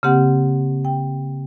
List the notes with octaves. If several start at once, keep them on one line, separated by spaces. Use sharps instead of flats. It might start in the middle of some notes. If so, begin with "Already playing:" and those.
C#3 A#3 C4 G4 F#5
G5